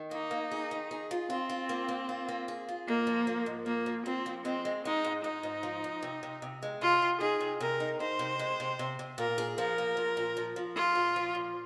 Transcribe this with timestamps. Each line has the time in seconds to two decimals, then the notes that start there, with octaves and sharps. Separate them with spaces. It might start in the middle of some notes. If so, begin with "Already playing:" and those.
Already playing: D#3
0.11 A#3 D#4
0.31 A#3
0.52 G#4
0.71 D#3
0.91 G#4
1.11 F4
1.30 C4 F4
1.49 F4
1.69 A#3
1.88 A#3
2.09 F4
2.28 A#3
2.48 G#4
2.69 F4
2.87 G#2 A#3
3.07 F3
3.27 F3
3.46 G#2
3.66 F3 A#3
3.86 F3
4.06 F3 C4
4.26 F3
4.45 G#3 C4
4.65 G#3
4.85 G#3 D#4
5.04 G#2
5.24 G#2 D#4
5.43 G#2
5.63 F3
5.84 G#2
6.03 C3
6.23 C3
6.42 C3
6.63 G#3
6.81 C3 F4
7.02 C3
7.21 D#4 G#4
7.41 C3
7.60 C3 A#4
7.80 D#4
8.00 D#4 C5
8.19 C3
8.39 G#3
8.60 C3
8.79 C3
8.99 C3
9.18 A#2 A#4
9.38 G#4
9.58 F3 A#4
9.78 A#3
9.97 F3
10.17 A#2
10.37 F3
10.56 F3
10.76 F4 G#4
10.95 A#2
11.16 F3
11.35 A#2